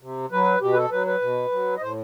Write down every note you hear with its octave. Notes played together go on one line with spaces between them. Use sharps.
C3
F#3 B4
B2 G4
B4
A4
F#3 B4
B4
B2
F#3
D#5
A2 C5